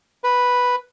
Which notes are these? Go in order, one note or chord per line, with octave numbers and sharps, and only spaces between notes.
B4